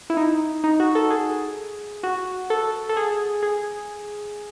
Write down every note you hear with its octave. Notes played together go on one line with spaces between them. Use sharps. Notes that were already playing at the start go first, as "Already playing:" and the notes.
E4
D#4
D#4
F#4
A4
G#4
F#4
A4
A4
G#4
G#4